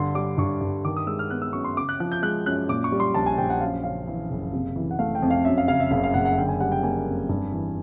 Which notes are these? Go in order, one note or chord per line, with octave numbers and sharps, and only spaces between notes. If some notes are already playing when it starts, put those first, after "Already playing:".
Already playing: G2 D3 C6
G3 D6
G2 C#6
G2
D#3 D6
D#6
G#3 E6
F6
B3 F#6
E6
F#2 C#6
C6
C#3 D6
F#6
F3 F#6
G6
G#3 F#6
F#2 F#6
A#2 D6
C#6
G3
C6
A#1 A5
G#5
A#1 G5
F#5
F#2 F5
C#3 F5
E3
F#1
C3
E3
F#5
A3 F5
G5
F2
F5
F#2 E5
F5
C#3 F5
E5
F#1 F5
F5
F#1 F#5
F#5
D3 G5
G#5
G3 F#5
G5
A#3 G#5
F2
G2
E3